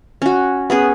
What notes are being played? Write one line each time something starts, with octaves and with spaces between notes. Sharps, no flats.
C#4 F#4
B3 C#4 G#4